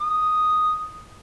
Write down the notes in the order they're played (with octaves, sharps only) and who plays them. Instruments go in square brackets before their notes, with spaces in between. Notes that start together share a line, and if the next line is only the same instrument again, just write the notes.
[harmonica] D#6